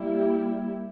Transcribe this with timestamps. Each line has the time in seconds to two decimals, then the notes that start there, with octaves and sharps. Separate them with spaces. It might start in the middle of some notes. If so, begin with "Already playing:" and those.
Already playing: G3 A#3 E4 G4